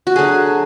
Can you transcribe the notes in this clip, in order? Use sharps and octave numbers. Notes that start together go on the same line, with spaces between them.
F#4
D3 F#3 A3 G#4